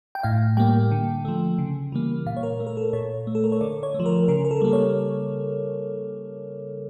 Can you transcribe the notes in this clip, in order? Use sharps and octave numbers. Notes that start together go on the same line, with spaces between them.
G5
A2 F5
G3 A#3 G5
D3
F3 A3
C#3
E3 G3 A#3
A#2 F5
C#5
A#4
A3
A#4
A4
A#2 C#5
A3
A4
A#4
C#5
D3 D5
C#5
A3
F3
A#4
C#3 A#4
A#4
A4
G3 A#3
C#5